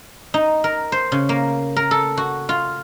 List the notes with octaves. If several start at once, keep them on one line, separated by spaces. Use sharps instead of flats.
D#4
A#4
C5
C#3
A#3
A#4
A4
F#4
F4